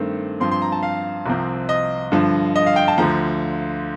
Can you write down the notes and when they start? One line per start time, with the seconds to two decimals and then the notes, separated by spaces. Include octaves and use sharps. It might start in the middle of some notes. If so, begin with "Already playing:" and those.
Already playing: G2 D#3 A3 C4
0.40 G2 F3 C4 C6
0.51 C6
0.62 A#5
0.72 A5
0.83 F5
1.26 C2 C3 F3 C4
1.69 D#5
2.12 G2 D3 F3
2.56 D#5
2.67 F5
2.76 G5
2.88 A5
2.98 D2 D3 F3 A#5